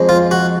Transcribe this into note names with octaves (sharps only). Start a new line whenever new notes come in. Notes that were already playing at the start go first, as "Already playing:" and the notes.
Already playing: F2 F3 G#3
F4
F#4